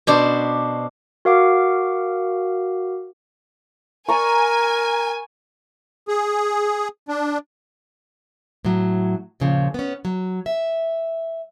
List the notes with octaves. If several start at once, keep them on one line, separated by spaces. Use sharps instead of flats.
B2 D4 C5
F#4 A#4 F5 F#5 D6
A#4 D5 G#5 A#5 C#6
G#4
D4
A2 F#3
D#2 A#2 C#3 F3
B3 C#4
F#3
E5